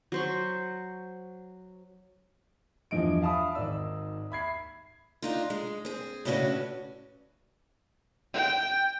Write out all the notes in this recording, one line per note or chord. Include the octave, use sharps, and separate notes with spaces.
F#3 C5 C#6
E2 G2 E3 F3 D#5 D7
E5 F5 A5 B5 D#6
G#1 D#4 D5 E6
E5 B5 G#6 C7
D4 D#4 F4
G#3
C4 G#4
A2 C#3 C#4 D4 F#4 B4
G5